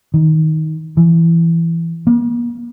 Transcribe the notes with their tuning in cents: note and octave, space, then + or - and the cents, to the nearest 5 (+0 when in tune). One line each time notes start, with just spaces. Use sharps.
D#3 +15
E3 +15
A#3 +45